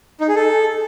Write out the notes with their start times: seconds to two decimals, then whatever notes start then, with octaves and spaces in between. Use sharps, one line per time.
0.21 D#4
0.28 G#4
0.36 A4